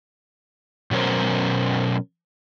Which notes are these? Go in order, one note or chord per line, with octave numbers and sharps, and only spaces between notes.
B2 F#3 C#4 A#4 C5